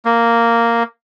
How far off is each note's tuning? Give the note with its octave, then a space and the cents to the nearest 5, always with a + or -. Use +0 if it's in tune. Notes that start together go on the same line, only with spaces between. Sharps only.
A#3 -5